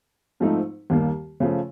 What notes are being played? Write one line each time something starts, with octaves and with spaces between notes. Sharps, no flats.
G#2 F3 A3 C4 D#4
D#2 D#3 G3 A#3
C#3 F3 A3